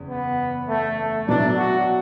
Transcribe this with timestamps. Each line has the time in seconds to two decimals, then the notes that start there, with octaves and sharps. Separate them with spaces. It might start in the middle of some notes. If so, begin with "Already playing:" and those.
Already playing: F#1 E2
0.09 B3
0.69 A3
0.98 A3
1.28 B2 F#3 B3 D4 E4 D5
1.57 F#4